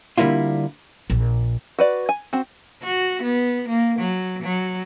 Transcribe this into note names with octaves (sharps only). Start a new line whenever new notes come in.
D3 G3 A#3 E4 F4
A#1
F#4 B4 D5
G#5
C4 F#4
F#4
B3
A#3
F#3
F#3